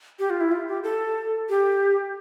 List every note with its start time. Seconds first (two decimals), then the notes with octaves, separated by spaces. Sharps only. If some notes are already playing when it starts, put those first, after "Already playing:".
0.19 G4
0.30 F4
0.41 E4
0.51 F4
0.68 G4
0.83 A4
1.49 G4